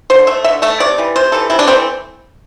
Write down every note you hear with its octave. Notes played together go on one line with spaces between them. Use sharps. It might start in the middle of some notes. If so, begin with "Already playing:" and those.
D3 C5
A3 E5
D3 E5
A3 E5
C3 D5
E3 G3
C3 C5
E3 G3 A4
C3 E4
D4
E3 A3 C4